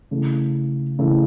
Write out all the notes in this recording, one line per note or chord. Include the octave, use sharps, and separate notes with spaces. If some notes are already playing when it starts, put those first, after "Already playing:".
C#3 E3 A3
C#3 E3 A3